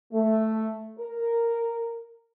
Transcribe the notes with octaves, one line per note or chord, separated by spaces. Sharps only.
A3
A#4